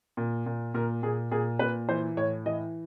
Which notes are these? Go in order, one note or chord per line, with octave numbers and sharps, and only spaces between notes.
A#2
A#2
A#2 A#4
A#2 G#4
A#2 G#4
A#2 B4
E3 C5
A2 C#5
E3 D#5